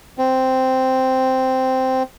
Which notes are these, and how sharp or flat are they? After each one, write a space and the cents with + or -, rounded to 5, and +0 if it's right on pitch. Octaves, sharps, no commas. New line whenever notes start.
C4 -5